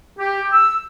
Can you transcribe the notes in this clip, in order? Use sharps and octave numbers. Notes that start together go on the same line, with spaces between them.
G4
E6